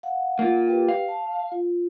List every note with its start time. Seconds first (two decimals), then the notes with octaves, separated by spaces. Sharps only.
0.03 F5 F#5
0.39 A#3 F4
0.67 G4 B4 G5
0.89 F5
1.08 A5
1.52 F4